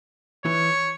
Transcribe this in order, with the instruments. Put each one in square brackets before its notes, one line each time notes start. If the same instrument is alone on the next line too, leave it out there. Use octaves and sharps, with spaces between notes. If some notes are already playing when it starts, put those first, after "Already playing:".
[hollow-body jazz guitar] E3 [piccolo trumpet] C#5